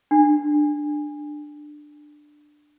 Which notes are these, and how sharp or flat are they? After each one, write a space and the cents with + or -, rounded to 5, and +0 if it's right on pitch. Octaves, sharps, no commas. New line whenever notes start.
D4 +15